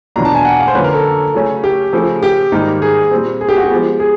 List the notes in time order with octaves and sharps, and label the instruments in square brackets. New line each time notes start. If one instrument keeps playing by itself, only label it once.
[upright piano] E2 B2 F#3 A#3 D4 [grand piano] A#5
[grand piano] A5
G#5
F#5
F5
C5
[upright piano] F2 D3 F#3 A#3 C#4 [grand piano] B4
[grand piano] A#4
A4
[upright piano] C#3 F#3 A3 C#4
[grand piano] G4
[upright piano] C#3 F3 A3
[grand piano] G4
[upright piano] G#2 D#3 G3 A#3 D#4
[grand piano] G#4
[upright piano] A#2 G3 C4
[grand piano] G#4
G4
F#4
G4
[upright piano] F3 G#3 B3
[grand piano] G#4